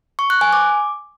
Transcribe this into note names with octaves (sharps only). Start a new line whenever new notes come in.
C#6
F#6
G#5
D6